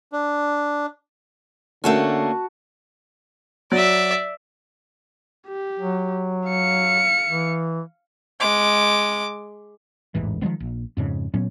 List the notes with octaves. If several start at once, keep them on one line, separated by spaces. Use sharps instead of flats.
D4
D3 A3 A#3 C#4 F#4 F#5 A5
F#3 D5 E5
G4
F#3
F5 C#7
E3
G#3 D6
E1 A1 G#2 E3
D#3 F3 G#3 B3
A#1
F2 G#2 C#3
A#2 F#3 B3 C#4